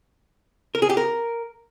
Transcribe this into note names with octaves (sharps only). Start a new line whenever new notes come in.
A#4
G#4
G4
A#4